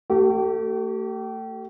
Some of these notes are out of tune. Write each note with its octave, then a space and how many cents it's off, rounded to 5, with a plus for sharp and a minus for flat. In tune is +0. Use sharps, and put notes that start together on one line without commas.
A3 +30 G4 -30